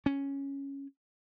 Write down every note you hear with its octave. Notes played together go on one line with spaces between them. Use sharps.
C#4